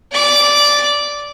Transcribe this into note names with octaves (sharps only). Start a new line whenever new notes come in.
D5 D6